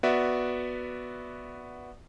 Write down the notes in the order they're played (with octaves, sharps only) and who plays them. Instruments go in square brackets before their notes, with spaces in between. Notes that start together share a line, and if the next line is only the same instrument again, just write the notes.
[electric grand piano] B3 F#4 D5 E5